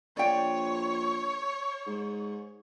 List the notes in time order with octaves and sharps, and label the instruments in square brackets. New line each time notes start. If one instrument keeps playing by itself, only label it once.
[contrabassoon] A#1 [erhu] C#5 [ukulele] D5 G5
[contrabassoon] G#2